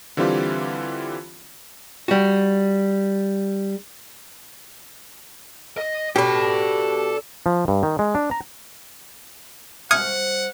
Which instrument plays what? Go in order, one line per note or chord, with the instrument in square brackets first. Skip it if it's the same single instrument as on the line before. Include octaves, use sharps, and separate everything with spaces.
[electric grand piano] D3 E3 G3 C4 F4 G4
[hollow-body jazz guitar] G3 F#4
[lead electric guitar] D#5
[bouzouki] B2 D4 [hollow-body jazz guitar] G4 [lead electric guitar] A4 B5
[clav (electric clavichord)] F3
G2
D#3
G#3
D4
A#5
[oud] G3 C4 C#5 [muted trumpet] F#5 [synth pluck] D#6 G#6 C#7 [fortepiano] F6